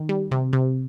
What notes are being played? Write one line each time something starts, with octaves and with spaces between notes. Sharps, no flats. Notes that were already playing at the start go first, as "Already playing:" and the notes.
Already playing: D#3
G3
C3
C3